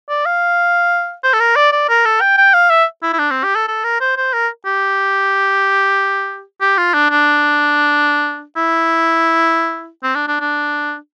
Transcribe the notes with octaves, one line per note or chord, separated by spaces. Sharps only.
D5
F5
C5
A4
A#4
D5
D5
A#4
A4
G5
G5
F5
E5
E4
E4
D4
C4
G4
A4
A4
A#4
C5
C5
A#4
G4
G4
F4
D4
D4
E4
C4
D4
D4
D4